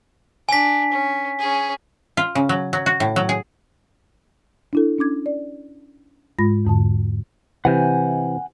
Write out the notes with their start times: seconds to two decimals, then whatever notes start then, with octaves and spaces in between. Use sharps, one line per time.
0.49 D4 G#5 B6
0.91 C#4
1.39 C#4 G#4
2.17 F4
2.35 C#3
2.49 F#3
2.73 F#3
2.86 F#4
3.00 A2
3.16 F#3
3.29 G#4
4.73 D4 E4 A4
4.98 C#4 D4 D6 G#6
5.26 D5
6.39 G#2 G#3 F4 B5 A#6
6.65 E2 G#2 D3 A5
7.65 C3 E3 F#5 G#5 G6